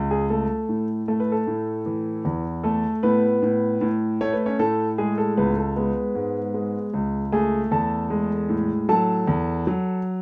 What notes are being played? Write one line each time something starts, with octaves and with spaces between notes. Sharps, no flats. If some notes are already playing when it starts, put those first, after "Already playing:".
Already playing: C#2
G#4
A3 A4
A2
A3 A4
B4
A4
A2
E3
E2
A3 A4
A2 B3 B4
A2
A2
A3 C#5
B4
C#4 C#5
A2 A4
G#3 G#4
A4
C#2 B3 B4
A4
G#3 B3 B4
G#2
G#3
C#2
A3 G#4 G#5
E2 A4 A5
G#3
A2
F#3 A4 A5
E2
F#3